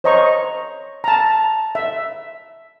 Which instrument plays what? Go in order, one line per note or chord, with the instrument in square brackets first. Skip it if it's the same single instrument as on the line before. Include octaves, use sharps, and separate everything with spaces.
[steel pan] C5 C#5 D#5 A#5 C#6
A5 A#5
E5